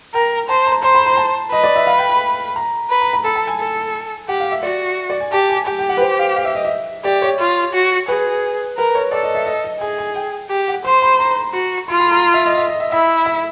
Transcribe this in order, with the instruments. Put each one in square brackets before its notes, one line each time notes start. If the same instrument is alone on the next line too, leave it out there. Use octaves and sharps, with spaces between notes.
[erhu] A#4 [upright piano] G5
[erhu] C5 [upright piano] A5
[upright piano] A#5
[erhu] C5 [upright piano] C6
[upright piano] B5
A#5
A5
[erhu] B4 [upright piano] D#5
[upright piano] D5
E5
F5
G5
B5
A#5
[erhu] B4
[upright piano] A#5
B5
[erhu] A4 [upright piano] B5
[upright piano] A5
G#5
[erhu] A4
[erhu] G4 [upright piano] F#5
[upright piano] F5
E5
[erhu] F#4 [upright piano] D5
[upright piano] D5
G#5
[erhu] G4 [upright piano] A5
[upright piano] G#5
[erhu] G4 [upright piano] G5
[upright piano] G5
F#5
B4
C5
F5
F5
E5
D#5
E5
[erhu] G4 [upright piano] D5
[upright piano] C#5
[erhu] F4
F#4
[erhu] G#4 [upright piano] B4
[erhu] A#4 [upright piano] B4
[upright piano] C#5
[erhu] A4 [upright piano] D5
[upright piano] D#5
E5
D#5
D#5
[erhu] G#4 [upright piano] G#5
[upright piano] G#5
G5
[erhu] G4
[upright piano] F#5
[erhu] C5 [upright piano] C6
[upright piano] B5
A#5
[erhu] F#4
[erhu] F4 [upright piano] C6
[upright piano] B5
A#5
E5
D#5
E5
D#5
E5
[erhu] E4 [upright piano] E5
[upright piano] E5